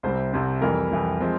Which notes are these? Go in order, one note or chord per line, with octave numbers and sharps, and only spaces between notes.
C2 C3 G3 C4 C5
C2 C3 G3 C4
F2 E3 G3 A#4
F2 E3 G3
F3 G#3 C4